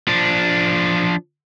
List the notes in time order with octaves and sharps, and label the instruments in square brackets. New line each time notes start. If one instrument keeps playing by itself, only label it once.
[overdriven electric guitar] F3 D4